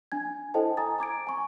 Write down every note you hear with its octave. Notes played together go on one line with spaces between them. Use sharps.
D4 G#5 G#6
E4 A4 C5 D#5 G5 A5
G#5 A#5 D#6 A6
A#5 D6 G#6 D7
G#5 C#6